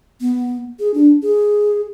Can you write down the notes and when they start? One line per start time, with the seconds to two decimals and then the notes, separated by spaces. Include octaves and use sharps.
0.21 B3
0.79 G#4
0.94 D4
1.22 G#4